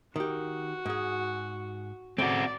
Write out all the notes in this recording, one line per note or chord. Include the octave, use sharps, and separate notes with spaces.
D#3 F#4 G4
G#2 G#4
C#3 A3 C4 F#4 D5